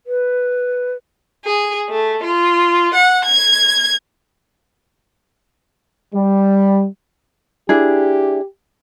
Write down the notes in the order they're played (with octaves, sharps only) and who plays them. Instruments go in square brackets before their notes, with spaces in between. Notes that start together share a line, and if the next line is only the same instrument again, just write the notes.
[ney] B4
[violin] G#4
A3
F4
F#5
G#6
[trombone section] G3
[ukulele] D4 E4 G#4 [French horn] G4